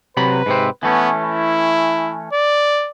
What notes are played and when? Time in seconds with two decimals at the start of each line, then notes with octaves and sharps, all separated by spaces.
0.17 C3 F#3 B4 B5
0.46 G#2 C3 C4
0.83 E3 A3 B3 C#4
1.24 E4
2.33 D5